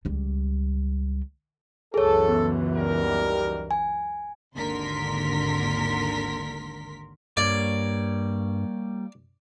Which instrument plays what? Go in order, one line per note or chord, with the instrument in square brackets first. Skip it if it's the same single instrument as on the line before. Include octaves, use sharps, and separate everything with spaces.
[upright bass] C#2 G3
[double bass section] C#2 F#2 E3 [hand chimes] G#4 C#5 [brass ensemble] A4
[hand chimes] B3
[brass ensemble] D#2 G3 A#4
[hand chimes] G#5
[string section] G#1 D#2 D3 A#4 C6 B6
[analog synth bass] G2 [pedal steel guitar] G3 A#3 C#5 [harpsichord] D5